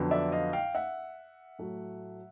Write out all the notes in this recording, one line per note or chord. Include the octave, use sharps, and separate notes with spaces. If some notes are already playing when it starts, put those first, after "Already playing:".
Already playing: F2 D3 F#3 B3
D5 E5
D#5 F5
F5 G5
E5 F#5
A2 F#3 A3